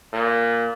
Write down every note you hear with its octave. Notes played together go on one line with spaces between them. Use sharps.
A#2